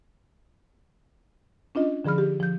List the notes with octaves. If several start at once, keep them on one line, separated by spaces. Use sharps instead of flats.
C#4 D4 F4 D#5
D3 F3 G#4 B5 F6
G4
F3 G6